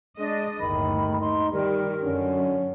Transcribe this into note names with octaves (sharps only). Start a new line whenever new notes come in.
G#3 D4 D#5
G1 D#2 A2 D#3 B5
D#4 C6
D#3 G3 G4 A#4
F#2 D3 C#4